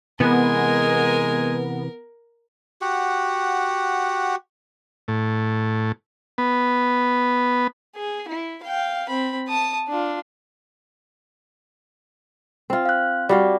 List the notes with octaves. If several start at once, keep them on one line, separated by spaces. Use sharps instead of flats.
C3 E3 G#3 B3 A#4 G#5
F#4 G4 F#5
A2
B3
G#4
E4
F5 G5
C4 B5
A5 D#6
D4 F4
C4 F4
F5 F#6
G3 F#4 D5 F5